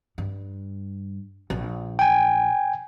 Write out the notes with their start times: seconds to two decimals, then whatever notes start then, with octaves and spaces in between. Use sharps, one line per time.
0.18 G2
1.50 A#1
1.99 G5 G#5